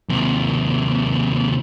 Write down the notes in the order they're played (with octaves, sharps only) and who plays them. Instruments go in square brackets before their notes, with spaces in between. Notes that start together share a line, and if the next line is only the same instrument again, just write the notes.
[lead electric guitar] D#2 C3